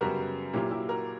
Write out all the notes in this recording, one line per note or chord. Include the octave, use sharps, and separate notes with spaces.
F#2 C#3 G3 B3 F#4 A#4
A#2 F#3 A#3 E4 G4
E4 G4
F#4 A#4